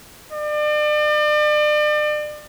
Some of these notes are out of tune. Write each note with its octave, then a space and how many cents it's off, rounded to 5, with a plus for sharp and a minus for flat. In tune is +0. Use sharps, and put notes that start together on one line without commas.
D5 +35